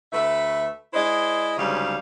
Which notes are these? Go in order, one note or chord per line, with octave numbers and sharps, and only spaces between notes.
D2 A3 B4 E5
G#3 E4 C5 D5 D#5
D2 G#2 C#3 F#3 G3 F5